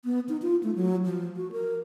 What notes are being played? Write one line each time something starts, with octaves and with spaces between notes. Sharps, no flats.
B3
D#4
F4
A3
F#3
F3
F#4
A#4